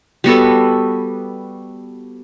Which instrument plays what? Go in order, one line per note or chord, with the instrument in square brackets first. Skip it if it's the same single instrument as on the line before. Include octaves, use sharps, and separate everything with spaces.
[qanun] G3 B3 F#4 A4